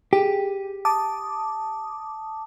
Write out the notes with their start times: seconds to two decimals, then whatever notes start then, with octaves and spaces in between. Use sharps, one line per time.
0.13 G4 G#4
0.85 A5 D6 D#6